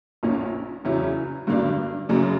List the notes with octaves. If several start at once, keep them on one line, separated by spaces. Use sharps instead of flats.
A#1 A#2 A#3 C#4
E2 C#3 F#3 C#4 E4
G2 D3 F#3 A#3 D4
F#2 C#3 F#3 A#3